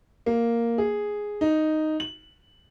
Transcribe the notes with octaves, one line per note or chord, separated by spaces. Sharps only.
A#3
G#4
D#4
F#7